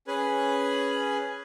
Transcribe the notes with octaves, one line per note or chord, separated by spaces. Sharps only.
C#4 G#4 B4 G#5